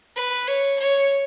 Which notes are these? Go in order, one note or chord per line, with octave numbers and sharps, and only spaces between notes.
B4
C#5
C#5